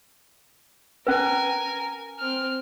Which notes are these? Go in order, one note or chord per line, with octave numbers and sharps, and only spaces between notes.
C#4 A#4 B4 G#5
C4 F6